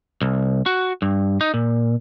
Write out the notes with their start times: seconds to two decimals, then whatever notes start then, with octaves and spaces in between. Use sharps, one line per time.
0.22 C2
0.66 F#4
1.02 G2
1.41 D#4
1.54 A#2